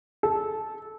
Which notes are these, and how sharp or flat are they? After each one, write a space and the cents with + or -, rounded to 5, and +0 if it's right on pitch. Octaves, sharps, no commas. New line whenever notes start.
A4 -15